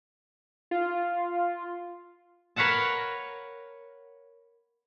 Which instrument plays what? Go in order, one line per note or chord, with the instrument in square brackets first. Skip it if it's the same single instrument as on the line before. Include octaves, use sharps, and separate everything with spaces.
[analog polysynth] F4
[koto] A#4 B4 C#5 F5 F#5 A5